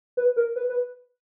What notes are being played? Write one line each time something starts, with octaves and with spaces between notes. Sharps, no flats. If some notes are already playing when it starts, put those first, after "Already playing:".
B4
A#4
B4
B4